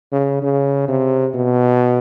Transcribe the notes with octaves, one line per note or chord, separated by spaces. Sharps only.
C#3
C#3
C3
B2